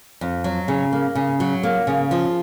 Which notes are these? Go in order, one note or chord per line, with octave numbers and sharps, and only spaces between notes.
F2
F#3
C#3
A#3
C#3
F#3
A#3
C#3
F3